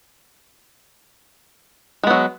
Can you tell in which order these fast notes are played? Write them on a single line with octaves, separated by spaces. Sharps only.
G#3 B3 F#3